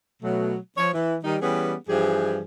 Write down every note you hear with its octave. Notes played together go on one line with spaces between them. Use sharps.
B2 F#3 A3
F3 C#5
E3
D#3 G3 D#4
E3 G3 B3 C#4 G4 G#4
G2 E3 F3 G4 G#4